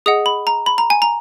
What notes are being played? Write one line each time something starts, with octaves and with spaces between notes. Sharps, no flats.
G#4 D#5 F#5 D#6
B5
A#5
B5
A#5
G#5
A#5